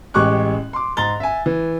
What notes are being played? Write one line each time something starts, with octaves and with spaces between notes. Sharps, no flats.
A1 G#3 G4 C#6 D6 F#6
C6 D6
G#2 A#5 C6 A6 G7
E5 G#5
E3